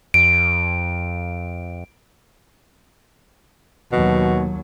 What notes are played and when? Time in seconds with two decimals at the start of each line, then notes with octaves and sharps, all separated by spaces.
0.14 F2 D7
3.92 D#2 B2 F#3